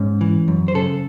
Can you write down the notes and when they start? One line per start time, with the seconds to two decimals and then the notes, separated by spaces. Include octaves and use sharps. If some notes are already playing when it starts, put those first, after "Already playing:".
Already playing: G#2 C#4
0.21 E3
0.48 F#2
0.68 C5
0.75 C#3 A4